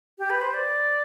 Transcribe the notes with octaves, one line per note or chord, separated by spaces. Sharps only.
G4
B4
C5
D5